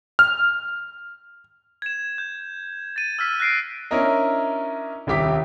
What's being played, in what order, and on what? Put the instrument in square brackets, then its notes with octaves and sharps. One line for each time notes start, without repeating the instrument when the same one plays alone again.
[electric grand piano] F6
[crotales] G#6 E7
G6
A6 D#7
E6 F6 B6
F#6 A#6 C7 D7
[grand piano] C#4 D4 E4 A#4 D#5
D#1 C2 E4 G4 D6 B6